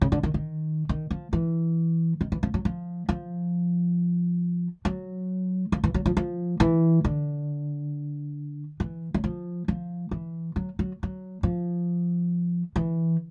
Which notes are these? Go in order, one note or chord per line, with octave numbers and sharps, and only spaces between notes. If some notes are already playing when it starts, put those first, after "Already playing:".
C#3
D3
D#3
D#3
D#3
F3
E3
D#3
E3
F3
F#3
F3
F3
F#3
F3
E3
F#3
F3
F3
E3
D3
E3
F#3
F3
F3
E3
F#3
F#3
F#3
F3
E3